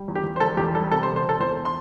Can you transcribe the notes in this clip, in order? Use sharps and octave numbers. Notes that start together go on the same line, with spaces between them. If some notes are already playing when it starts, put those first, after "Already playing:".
Already playing: G3
E2
G4
E2
C5
E1 A4
E2 G4
G3 A4
C3 A4
C5
E1
C5
E1
A4
E2 C5
C6